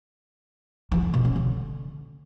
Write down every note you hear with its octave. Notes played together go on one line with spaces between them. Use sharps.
E3
D3
B2
C#4
D3